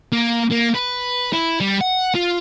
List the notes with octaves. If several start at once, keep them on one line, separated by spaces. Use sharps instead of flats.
A#3
A#3
B4
E4
G3
F#5
F4